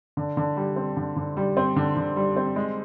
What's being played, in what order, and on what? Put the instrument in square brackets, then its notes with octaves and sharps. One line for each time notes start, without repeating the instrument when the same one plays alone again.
[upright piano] D3
D3
G3
C4
D3
D3
G3
C4
D3
D3
G3
C4
G#3